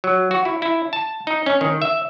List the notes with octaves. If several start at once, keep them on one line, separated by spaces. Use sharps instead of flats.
F#3
F#4
E4
E4
A5
D#4
C#4
D#3
E5